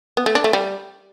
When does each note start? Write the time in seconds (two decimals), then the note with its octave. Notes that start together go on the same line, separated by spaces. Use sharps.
0.17 B3
0.26 A3
0.35 D4
0.44 A3
0.53 G3